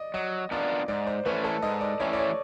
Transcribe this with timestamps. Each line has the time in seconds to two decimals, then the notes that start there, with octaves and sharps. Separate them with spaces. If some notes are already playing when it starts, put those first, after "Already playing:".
Already playing: D5 D#5
0.14 F#3 D#5
0.51 B3 D4 F4 A#4 D5
0.88 G#2 D5
1.07 C5
1.25 E3 A3 C#4 E4 B4
1.44 A4
1.62 G#2 D#5
1.81 D5
2.00 E3 A3 C#4 E4 C#5
2.13 D5
2.19 C#5